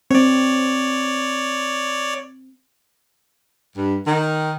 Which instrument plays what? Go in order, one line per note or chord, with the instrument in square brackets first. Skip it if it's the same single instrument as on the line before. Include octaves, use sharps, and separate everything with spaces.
[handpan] C4 [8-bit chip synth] C#5 D5
[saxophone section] G2
D#3